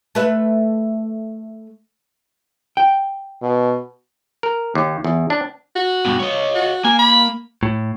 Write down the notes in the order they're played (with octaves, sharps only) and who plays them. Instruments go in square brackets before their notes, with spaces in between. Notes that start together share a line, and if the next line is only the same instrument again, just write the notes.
[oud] A3 B4 E5
[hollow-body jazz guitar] G5
[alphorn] B2
[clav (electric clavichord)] A#4
D#2
E2
D4
[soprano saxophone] F#4
[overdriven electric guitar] G2 B2
C#5 D#5
[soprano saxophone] F#4
[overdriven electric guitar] A#3 [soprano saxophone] G#5
[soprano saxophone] B5
[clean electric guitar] A2